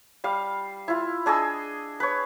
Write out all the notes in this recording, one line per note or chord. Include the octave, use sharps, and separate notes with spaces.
G3 F5
E4 F4
D4 G#4 D#5 E6
B4 C#5